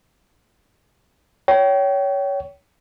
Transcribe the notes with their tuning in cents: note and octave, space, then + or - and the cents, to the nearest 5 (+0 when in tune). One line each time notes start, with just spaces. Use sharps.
C#5 +20 G5 -25